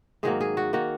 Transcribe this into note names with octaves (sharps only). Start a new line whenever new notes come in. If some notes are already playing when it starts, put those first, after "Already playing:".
G#2 D#3 F#3 A#3 G#4
G#4
F#4
D#3 A#3 F#4